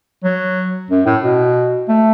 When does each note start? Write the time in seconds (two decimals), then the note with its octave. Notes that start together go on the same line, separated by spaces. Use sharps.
0.24 F#3
0.91 F#2
1.06 A2
1.22 B2
1.89 A3